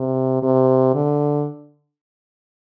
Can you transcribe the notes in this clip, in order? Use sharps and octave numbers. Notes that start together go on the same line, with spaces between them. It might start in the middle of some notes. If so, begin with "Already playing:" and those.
Already playing: C3
C3
D3